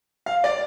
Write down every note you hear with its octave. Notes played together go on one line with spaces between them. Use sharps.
F5
D5